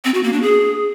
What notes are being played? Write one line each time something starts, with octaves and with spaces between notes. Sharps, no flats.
C4
F#4
A#3
D4
G#4